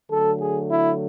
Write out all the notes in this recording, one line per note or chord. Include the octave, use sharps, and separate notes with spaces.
D3 F#3 A3 A4
G#4
E4